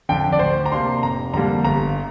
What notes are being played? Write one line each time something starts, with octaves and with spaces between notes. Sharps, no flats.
F2 D3 G5
D5
D2 C5
A#5
C3 A#3 D4 C6
F1 A#5
F2 D3 G3 A#3 A#5
G1 A#5